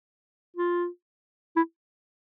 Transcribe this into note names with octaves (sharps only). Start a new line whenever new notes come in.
F4
E4